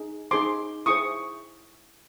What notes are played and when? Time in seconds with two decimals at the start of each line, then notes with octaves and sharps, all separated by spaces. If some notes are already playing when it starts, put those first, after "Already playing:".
Already playing: D#4 G#4
0.31 D#4 G#4 C5 C6 D6
0.86 E4 G#4 C5 C#6 D#6